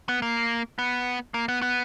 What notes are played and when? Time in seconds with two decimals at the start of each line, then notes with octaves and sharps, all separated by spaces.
0.09 B3
0.22 A#3
0.79 B3
1.34 A#3
1.48 B3
1.62 B3